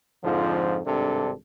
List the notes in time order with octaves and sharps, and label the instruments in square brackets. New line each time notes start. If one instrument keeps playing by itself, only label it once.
[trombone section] F2 G#2 D3 F3
G#1 G2 C3 D4 A4